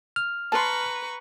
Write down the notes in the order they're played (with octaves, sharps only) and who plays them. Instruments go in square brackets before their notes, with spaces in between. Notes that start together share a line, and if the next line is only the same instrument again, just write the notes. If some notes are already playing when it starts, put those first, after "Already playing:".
[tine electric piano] F6
[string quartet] B4 A#5 C#6 [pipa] A5 C6